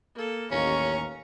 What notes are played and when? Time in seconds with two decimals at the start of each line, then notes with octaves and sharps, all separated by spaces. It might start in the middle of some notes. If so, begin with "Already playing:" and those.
0.15 A#3 A4
0.51 A1 D#2 C#4 F5 A#5 C#6